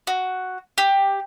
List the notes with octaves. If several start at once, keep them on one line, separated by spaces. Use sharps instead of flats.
F#4
G4